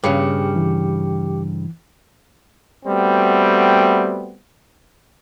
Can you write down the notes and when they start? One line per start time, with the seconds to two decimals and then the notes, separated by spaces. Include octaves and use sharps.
0.04 G2 C#3 G4 G#4 C#7
0.56 E3
2.86 G3 A3 B3 C4 F#4